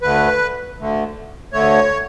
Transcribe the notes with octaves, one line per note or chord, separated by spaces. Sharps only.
D2 D3 A3 B4
D2 D3 A3
D2 D3 A3 C#5